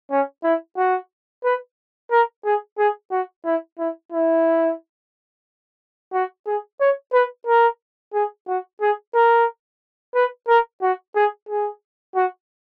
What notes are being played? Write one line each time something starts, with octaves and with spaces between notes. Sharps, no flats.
C#4
E4
F#4
B4
A#4
G#4
G#4
F#4
E4
E4
E4
F#4
G#4
C#5
B4
A#4
G#4
F#4
G#4
A#4
B4
A#4
F#4
G#4
G#4
F#4